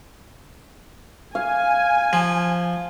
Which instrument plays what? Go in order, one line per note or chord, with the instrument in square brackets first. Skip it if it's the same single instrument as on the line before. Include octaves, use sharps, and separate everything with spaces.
[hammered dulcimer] F5 [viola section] G#5
[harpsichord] F3